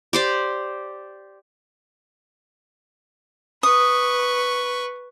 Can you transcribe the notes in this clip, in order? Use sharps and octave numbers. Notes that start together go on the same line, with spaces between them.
G4 C5 D5
B4 C#6 D#6